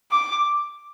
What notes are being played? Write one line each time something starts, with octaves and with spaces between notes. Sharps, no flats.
D6